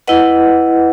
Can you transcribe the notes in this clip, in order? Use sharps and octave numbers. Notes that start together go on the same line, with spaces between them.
E4 B4 D#5 F#5